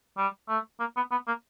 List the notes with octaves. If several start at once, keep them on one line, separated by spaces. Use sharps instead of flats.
G3
A3
A#3
B3
B3
A#3